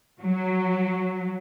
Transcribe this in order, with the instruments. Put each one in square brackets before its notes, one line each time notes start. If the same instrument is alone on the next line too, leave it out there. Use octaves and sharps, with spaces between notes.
[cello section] F#3